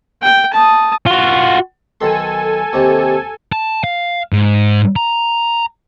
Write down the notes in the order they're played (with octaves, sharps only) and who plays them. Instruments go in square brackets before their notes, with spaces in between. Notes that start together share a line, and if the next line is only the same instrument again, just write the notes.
[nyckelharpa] G5
A5 D#6
[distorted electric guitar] F4 F#4
[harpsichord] B1 D#3 C6 [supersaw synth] A4 G#5
[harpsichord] D#2 C3 D#4
[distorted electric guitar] A5
F5
G#2
A#5